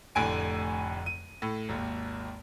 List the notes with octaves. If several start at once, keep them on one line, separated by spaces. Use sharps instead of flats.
F1 A2 D3 G#5 D7
D#7
A2
G#1 D#2